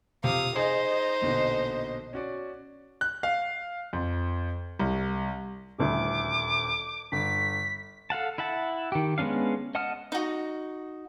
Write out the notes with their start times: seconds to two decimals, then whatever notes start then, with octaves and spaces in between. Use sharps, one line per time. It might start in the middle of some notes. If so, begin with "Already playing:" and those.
0.24 C3 F3 F5 D#6
0.56 D#4 G#4 C5 D#5
1.22 A#1 B2 D3
2.13 C#4 F#4 D5
3.01 F#6
3.23 F5
3.93 F2
4.79 C2
5.78 D#1 D2 E4 D6
7.12 G1 B6
8.10 A4 F5 F#5 A5
8.38 E4 E5 F#5 A5
8.92 D#3 G4
9.18 G#3 B3 C#4 D4 F5
9.75 D#5 F#5 A5 D#6 F6
10.12 D#4 F#4